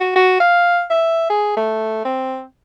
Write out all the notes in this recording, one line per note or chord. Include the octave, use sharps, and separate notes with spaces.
F#4
F#4
F5
E5
G#4
A3
C4